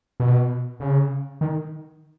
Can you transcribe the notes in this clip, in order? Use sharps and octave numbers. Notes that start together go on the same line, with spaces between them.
B2
C#3
D#3